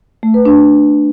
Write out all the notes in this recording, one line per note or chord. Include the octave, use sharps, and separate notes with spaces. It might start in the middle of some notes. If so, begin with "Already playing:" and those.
A3
B4
D4